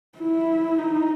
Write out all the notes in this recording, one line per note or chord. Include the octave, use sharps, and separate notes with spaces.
E4
D#4